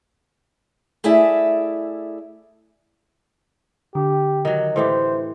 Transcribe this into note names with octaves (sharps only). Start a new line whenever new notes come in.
A3 E4 G#4 D5 E5
D3 G4
D#3 F#3
A2 E3 G4 C5